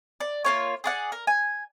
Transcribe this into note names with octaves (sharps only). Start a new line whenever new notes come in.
D5
A#3 F4 C#5
G#4 D5 F#5
A#4
G#5